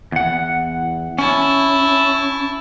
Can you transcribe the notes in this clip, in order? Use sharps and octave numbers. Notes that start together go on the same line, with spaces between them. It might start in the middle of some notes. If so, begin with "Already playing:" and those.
E2 F#5
C#4 E4 A5